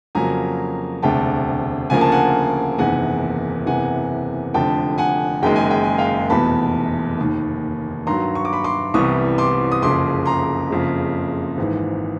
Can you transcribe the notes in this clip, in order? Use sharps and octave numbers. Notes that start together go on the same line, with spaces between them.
F2 C#3 F#3 A#3 G#5 A#5
E1 D2 C3 G5 A5
D2 C#3 F3 A#3 G#5
A5
F#5 G#5
F#1 E2 C3 D#3 F#5 G#5
F#1 E2 C3 E3 F#5 G#5
F1 F2 D3 G5 A5
F#5 G#5
F#1 F#2 D#3 G#3 G5
G#5
G5
G#5
F5 G5
F1 E2 B2 A5 B5
F1 D#2 D#3
G2 D#3 F#3 A#5 C6
C#6
D6
B5 C#6
C6 D6
C2 C3 E3 G3 B3 C#6 D#6
C6 D6
D#6
F#1 F2 C#3 C6 D6
A#5 C6
F#1 F2 C#3
G#1 G#2 E3